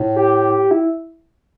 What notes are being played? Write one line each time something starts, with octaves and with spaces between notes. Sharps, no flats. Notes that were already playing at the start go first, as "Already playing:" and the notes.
Already playing: A2
G4
E4